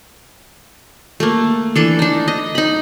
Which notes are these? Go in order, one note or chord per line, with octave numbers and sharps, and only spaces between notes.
A3 A#3
E3 D4 A4
D4 D#4
D#5
D#4 B5